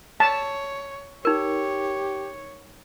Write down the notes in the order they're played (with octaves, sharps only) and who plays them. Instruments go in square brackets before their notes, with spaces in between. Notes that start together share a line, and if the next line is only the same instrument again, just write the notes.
[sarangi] C#5 [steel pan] A5
[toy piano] D#4 A#4 [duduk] G4 [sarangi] C#5